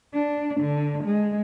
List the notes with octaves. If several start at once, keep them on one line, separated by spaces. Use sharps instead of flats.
D4
D3
G#3